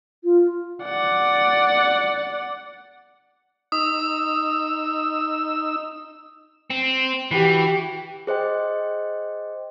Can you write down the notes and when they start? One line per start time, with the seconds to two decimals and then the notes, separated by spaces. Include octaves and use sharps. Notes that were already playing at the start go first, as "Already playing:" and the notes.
0.24 F4
0.84 D5 F#5
3.72 D#4 D#6 E6
6.70 C4
7.31 E3 F#4 G4
8.27 G#4 C5 D#5 G5